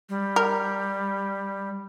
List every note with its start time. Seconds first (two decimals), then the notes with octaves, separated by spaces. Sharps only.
0.09 G3
0.36 A#4